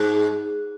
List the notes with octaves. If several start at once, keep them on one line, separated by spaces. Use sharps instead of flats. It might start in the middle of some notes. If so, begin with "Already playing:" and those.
Already playing: G#2